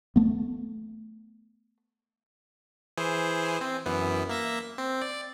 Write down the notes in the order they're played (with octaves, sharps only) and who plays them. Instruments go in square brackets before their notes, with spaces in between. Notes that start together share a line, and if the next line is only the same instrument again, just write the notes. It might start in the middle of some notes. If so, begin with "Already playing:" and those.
[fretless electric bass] A3 B3
[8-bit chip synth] E3 G#4 C5
C4
F#2 E3 B3
A#3 E5 A#6
C4
D5